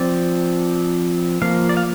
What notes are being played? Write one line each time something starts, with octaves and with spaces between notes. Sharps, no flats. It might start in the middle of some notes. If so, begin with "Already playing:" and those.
Already playing: F3 C4 D5
F3 A#3 F5
D5
F5